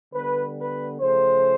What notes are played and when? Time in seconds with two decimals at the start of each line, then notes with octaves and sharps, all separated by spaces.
0.14 D3 G3 B3 B4
0.57 B4
1.01 C#3 F3 A3 C5